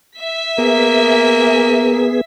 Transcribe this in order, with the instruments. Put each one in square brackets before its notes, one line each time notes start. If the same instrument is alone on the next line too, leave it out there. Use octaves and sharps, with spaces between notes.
[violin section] E5 B6
[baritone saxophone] A#3 [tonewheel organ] B3 G#4